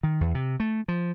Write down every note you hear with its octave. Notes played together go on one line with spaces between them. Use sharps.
D#3
E2
C3
A3
F3